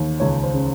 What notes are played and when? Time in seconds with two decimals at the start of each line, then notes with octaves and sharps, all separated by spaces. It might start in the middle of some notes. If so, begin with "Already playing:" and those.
Already playing: D#2
0.20 C#2 C#5
0.43 C5
0.54 C#3